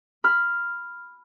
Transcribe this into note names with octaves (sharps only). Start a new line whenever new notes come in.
B5 F6